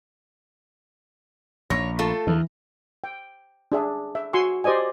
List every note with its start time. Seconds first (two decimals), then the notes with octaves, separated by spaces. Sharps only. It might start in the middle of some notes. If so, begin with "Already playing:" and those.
1.70 A#1 C#5 A#6
1.99 A3 F4 A4
2.27 E2 E3
3.04 G5
3.72 D4 G#4 E5
4.15 E5
4.33 F#4 G#5 C6 C#6 E6
4.64 G4 C5 D5 D#5 G#5